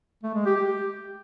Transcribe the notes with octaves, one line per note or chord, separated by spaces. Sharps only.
A3
G#3
G4
G4